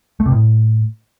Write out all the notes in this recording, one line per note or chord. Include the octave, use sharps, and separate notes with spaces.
A3
C3
A2